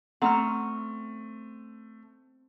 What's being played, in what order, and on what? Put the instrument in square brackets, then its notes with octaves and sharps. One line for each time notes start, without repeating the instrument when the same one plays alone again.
[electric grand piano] A3 [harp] C4 C#5 F6 [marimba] F#5 A#5